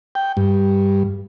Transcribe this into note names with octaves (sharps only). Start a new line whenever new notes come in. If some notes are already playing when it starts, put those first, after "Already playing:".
G5
G2